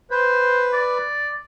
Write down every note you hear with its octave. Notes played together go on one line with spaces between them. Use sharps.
B4 C5
D5